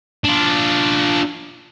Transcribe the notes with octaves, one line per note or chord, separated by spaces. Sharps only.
D4 F4